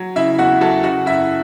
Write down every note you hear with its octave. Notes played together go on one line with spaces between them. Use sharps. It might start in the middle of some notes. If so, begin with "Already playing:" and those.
Already playing: F#3
C#3 E4 E5
E2 F#4 F#5
F#3 A4 A5
C#3 F#4 F#5
F#2 E4 E5